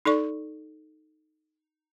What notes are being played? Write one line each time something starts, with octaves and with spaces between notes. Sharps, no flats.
D#4 A4 D5 C#6